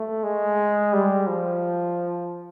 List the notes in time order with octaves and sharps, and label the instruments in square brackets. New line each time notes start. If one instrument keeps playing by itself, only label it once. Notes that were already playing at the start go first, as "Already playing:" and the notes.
Already playing: [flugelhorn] A3
G#3
G3
F3